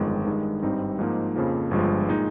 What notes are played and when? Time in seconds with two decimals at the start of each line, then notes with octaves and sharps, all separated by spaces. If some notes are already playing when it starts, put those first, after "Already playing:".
Already playing: G1 F2 D#3 G#3
0.26 G2 D#3 G#3 D#4
0.63 G#1 G2 G3 C4 D#4
0.99 G#2 F3 A#3 D#4
1.36 F2 C#3 F3 A#3
1.71 G1 G2 F3 G#3
2.08 A#2 G#3 D#4